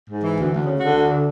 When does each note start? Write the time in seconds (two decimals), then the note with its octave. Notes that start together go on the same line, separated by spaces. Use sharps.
0.09 G#2
0.23 E3
0.38 D2
0.52 D2
0.66 C#3
0.80 D3 F#4
0.95 D2
1.10 D3